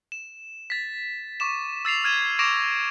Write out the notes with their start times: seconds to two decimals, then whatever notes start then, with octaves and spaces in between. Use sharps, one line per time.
0.12 E7
0.70 A6 B6
1.40 C#6 D6 E7
1.85 E6 A6 C7 F7
2.04 F6 G#6 D#7 E7
2.39 C#6 D6 A#6 D7 E7 F7